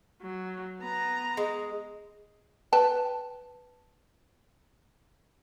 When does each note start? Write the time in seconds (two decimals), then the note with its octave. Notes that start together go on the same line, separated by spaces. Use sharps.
0.22 F#3
0.80 B3 A#5
1.37 G#3
2.73 B4 G5 A5